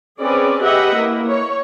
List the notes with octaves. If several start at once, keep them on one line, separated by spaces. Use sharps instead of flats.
C4 C#4 G#4 B4 D5
G4 G#4 B4 D#5 E5 F#5
A#3 E4
C#5